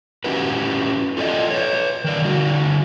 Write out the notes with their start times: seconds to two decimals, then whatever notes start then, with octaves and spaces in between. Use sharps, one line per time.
0.24 C#4 E4 F#4 G4 B4
1.17 F4 A4 D5 D#5
1.50 B4 C#5
2.04 D#3 A#4 D5
2.22 D3 G3 F#4